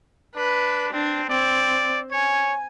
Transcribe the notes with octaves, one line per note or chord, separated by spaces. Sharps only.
D4 B4
C4 D4
C4 D5
C#5 G#5